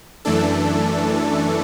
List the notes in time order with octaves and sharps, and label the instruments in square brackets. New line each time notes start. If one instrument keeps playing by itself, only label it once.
[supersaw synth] F#2 E3 A3 D4 A4